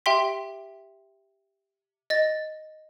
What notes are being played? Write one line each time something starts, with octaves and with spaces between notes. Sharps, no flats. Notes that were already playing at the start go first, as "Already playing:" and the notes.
G4 E5 G5 C6 B6
D#5 A6